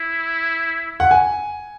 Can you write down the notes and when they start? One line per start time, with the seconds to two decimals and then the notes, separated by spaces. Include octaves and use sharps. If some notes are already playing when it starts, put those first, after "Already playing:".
Already playing: E4
1.00 F#5
1.11 G#5